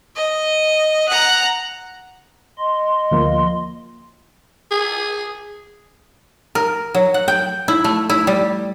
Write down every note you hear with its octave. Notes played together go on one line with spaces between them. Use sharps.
D#5
F#5 A#5
D#5 C6
D2 F3 A#3
G#4
A#4
F#3
F#5
G5
E4
A3
E4
G3